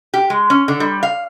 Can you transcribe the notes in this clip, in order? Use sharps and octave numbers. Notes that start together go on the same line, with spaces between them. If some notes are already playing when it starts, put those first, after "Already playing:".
G4
G#3
C#4
D3
G3
F5